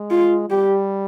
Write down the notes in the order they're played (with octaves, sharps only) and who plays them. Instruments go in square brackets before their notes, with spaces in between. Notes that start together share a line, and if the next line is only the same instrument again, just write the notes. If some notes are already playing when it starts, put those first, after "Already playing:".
Already playing: [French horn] G#3
[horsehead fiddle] F4
[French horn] G3 [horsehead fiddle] G4